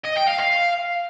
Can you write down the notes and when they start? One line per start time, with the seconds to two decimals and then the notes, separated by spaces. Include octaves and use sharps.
0.05 D#5
0.17 G5
0.28 F5
0.40 F5